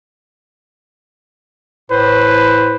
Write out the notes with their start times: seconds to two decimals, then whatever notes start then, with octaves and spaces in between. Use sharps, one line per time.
1.91 A2 B4 C5